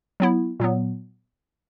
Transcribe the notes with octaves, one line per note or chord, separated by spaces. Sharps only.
F#3 B3 E4
A#2 F#3 B3